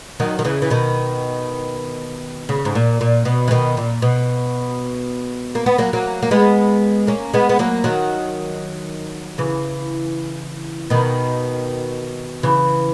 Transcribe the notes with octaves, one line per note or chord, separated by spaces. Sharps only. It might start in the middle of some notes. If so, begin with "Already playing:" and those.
D#3 F#3
D#3
C#3 E3
E3
B2 D#3
C#3
G#2
A#2
A#2
B2
E3
B2 D#3
A#2
B2
A#3
B3
F#3 A#3
F#3 A#3
A#3
G#3 B3
A#3 C#4
G#3 B3
B3
F#3 A#3
D#3 F#3
C#3 E3
B2 D#3
C#3 E3